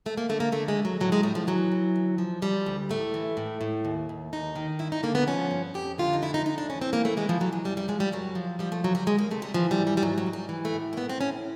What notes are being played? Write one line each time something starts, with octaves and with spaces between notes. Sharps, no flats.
D2 A3
A#3
D3 A3
A#3
D3 A3
G#3
D2
F#3
A2 F#3
G#3
A2 G3
F3
E3 F#3
E3
D2
F3
F3 G3
D2
A2 A3
E3
A2
A2
D#2
D#2
D#2 D#4
D#3
G2 E4
D#4
D3 A#3
B3
F3 C#4
G2
F2 G4
D3 F4
D#4
F2 E4
D#4
F2 D#4
D4
E3 C#4
C4
E3 A#3
A3
E3 G#3
F3
E3 F#3
G#3
F#2 G3
G3
F3 G#3
G3
F#2 F#3
F3
F3 G3
A3
D2 F#3
G3
D2 G#3
A#3
C3 A3
G3
E3 F3
G3
G#2
G3
G3
G#2 F#3
F#3
G#2
G3
E3
A3
A2
A#3
A2 B3
C4
A2 C#4